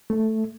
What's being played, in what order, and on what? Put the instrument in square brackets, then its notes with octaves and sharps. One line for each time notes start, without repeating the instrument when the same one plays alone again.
[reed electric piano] A3